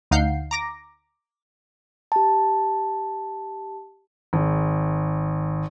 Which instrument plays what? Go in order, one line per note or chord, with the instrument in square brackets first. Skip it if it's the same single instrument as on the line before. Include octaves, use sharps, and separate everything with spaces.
[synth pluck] D2 D#4 F5 F#5 G6 C7
A#5 D6 A#6
[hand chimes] G4 A5
[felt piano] G#1